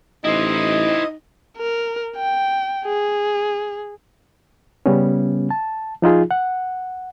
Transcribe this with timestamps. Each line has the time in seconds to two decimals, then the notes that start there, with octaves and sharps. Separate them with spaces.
0.24 A1 D#4 E4 C5 D#5
1.57 A#4
2.16 G5
2.86 G#4
4.86 C#3 G3 B3 C#4
5.51 A5
6.02 F3 D#4 F4 G#4
6.31 F#5